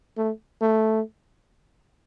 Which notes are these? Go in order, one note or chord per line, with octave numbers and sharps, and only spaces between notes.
A3
A3